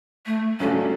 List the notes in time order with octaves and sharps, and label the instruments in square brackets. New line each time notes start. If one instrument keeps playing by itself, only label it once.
[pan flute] A3
[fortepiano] G2 F#3 A3 D4 F#4 [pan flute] C#4